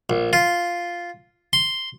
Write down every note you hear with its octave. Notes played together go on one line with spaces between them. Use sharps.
A#1
F4
C6